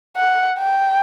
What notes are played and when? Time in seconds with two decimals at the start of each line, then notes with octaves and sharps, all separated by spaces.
0.16 F#5
0.58 G5